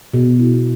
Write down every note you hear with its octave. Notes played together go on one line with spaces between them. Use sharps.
B2
E4